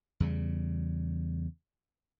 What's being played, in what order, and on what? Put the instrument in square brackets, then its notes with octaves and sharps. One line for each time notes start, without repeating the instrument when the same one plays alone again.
[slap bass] E2 C#3 G3